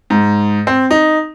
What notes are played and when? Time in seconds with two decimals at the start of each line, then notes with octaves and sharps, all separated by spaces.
0.10 G#2
0.67 C4
0.91 D#4